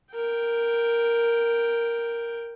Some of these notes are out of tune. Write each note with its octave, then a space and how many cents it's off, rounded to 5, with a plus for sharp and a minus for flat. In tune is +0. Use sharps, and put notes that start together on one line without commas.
A#4 +0 G5 +0